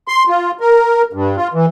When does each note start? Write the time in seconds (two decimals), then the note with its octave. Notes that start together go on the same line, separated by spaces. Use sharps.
0.08 C6
0.29 F4
0.60 A#4
1.13 G2
1.37 F4
1.53 E3